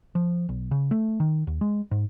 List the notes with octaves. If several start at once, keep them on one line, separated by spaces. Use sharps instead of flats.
F3
B1
C#3
A3
D#3
D#2
G#3
G#2